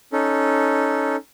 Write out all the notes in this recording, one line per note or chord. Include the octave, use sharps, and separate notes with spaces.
C#4 D#4 A4